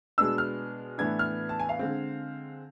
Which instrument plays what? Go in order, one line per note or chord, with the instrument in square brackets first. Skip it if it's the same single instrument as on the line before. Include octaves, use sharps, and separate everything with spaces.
[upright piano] B2 G#3 B3 D4 E6
F6
A2 E3 B3 D4 G#6
F6
A5
G#5
F5
D3 G#3 C4